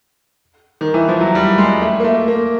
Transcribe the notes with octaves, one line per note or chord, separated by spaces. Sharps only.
D#3
E3
F3
F#3
G3
G#3
A3
A#3
A3
A#3